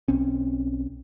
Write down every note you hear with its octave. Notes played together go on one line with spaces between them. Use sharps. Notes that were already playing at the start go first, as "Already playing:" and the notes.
B1 C4 C#4